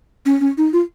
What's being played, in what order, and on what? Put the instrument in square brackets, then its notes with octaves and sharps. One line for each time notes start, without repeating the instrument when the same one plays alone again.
[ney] C#4
C#4
D#4
F4